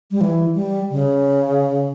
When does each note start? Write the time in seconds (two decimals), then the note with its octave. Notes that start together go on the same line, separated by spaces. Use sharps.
0.11 G3
0.21 E3
0.55 G3
0.91 C#3